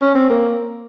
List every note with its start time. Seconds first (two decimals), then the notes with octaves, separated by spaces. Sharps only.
0.02 C#4
0.15 C4
0.30 A#3